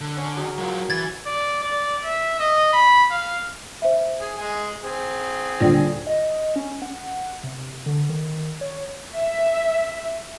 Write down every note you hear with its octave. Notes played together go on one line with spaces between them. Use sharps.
D3
C#4
F#3 C#4 G#4
F#3 F4 A#4
E3 G#6 A6
D5
D5
E5
D#5
B5
F5
C5 E5
G#4
G#3 G#5
C4 G#4
D#1 D3 F4 D5 G5 A#6
D#5
C#4
F#5
C3
D3
D#3
C#5
E5